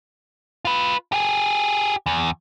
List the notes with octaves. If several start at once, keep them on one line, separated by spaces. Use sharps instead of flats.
F4 B4
G4 G#4
E2